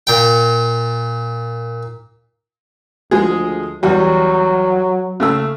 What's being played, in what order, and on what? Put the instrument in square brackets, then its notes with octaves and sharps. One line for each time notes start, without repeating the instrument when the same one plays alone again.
[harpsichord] A#2 G5
[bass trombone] D2 [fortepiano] F3 G#3 G#4
[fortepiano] E2 G3 [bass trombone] F#3
[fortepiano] C#3 A3 E6